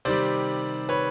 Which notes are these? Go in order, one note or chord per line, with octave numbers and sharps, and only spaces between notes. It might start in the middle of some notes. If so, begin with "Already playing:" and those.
C3 D#3 G3 C5 D5
B4 C#5